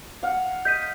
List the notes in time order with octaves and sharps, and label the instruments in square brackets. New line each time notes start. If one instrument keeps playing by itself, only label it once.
[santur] F5 F#5
[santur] D#5 [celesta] G6 B6 D#7